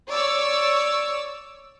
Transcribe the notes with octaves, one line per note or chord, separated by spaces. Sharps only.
C#5 D5 E6